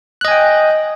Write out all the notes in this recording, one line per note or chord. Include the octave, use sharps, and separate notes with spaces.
D#5 G5 G#5 F#6